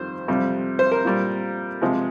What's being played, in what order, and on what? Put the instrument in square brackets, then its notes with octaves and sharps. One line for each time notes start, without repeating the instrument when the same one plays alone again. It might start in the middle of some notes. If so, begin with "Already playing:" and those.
Already playing: [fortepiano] F2 D#3 G3 C5
F2 C3 G3
C5
A#4
A#2 G3
C3 F3 G#3